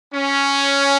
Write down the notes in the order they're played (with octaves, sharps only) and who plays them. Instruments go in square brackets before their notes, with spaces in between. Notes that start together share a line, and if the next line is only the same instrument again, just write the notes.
[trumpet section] C#4